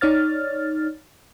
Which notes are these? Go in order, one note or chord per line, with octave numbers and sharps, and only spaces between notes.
D#4 C#5 D5 F6 A6